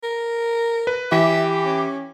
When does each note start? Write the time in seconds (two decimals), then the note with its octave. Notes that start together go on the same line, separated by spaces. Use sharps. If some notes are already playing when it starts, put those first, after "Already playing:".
0.04 A#4
0.87 B4
1.12 E3 G4 E5
1.65 C#4